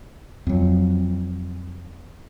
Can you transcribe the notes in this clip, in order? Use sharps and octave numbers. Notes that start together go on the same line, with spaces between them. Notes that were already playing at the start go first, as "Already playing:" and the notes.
F2 F#3